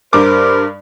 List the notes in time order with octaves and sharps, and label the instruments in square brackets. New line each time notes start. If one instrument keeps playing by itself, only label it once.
[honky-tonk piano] G2 D6 [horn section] A#4 C5